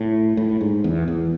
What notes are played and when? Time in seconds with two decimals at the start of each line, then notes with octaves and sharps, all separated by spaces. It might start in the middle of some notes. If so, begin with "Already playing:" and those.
Already playing: A2
0.37 A2
0.61 G#2
0.84 E2
1.08 E2